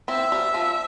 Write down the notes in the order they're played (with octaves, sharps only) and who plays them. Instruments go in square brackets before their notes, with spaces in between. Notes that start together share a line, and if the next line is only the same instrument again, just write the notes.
[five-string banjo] C4 E4 [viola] E5
[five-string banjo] G3
F3